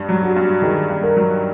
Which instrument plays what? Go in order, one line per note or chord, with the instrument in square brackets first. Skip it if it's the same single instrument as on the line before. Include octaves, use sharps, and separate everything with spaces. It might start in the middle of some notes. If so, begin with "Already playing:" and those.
Already playing: [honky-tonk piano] G2
F#3
[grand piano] F#4
[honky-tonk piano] G2
[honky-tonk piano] D#3 [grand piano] G#4
[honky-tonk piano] G2
[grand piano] A#4
[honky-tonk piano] F#3